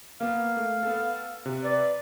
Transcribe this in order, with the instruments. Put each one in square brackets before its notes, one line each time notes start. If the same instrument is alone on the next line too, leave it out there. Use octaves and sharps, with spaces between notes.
[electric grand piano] A#3 B3 [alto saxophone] F5
[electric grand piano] A3
B3 A4
C3
[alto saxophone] B4 [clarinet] D5